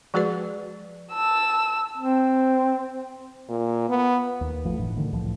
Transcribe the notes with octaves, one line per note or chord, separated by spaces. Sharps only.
F3 G#3 F#4 G#4 B4 D5
A5 E6
C4
A#2
B3
D#2
G#1 F3 A3
F#1 A2 E3 D4
B2 D3 D#3 A3
C2 A2 E3 F3